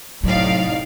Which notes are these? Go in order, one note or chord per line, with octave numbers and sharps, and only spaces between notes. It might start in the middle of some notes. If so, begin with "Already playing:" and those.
A2 C3 F#3 D#4 D5 F5